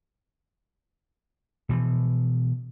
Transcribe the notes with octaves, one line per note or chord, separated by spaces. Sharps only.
B2 E3 F3